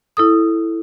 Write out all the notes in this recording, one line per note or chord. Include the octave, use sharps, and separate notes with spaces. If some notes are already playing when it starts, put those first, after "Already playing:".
E4 A4 D#6